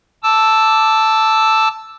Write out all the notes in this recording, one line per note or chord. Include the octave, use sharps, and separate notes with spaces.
A5 D6 E6